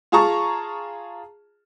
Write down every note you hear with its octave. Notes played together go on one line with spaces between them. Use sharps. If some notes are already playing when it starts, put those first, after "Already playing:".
F4 G#4 A5 A#5 C#6